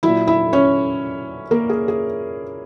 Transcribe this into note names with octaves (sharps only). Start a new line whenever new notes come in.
A#2 F#3 E4 E5
E4 E5
C#4 C#5
A#3 A#4
G#4
G#4